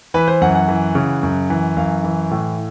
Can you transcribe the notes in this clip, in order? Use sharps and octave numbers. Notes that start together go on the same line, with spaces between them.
E3 B4
C5
F#2 F#5
F#5
E3
C#3
F#2
E3
F#2 F5
E3
A2